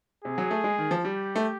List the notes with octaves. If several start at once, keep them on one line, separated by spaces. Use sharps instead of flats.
C3 G#4
F#3
A3
G#3
D#3
F3
G3 G4
A3